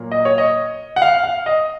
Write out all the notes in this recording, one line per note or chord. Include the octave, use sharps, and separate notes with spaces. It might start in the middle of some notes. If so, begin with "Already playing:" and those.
Already playing: A#2 F#3 A#3
D#5
C#5
D#5
F#5
F5
F5
D#5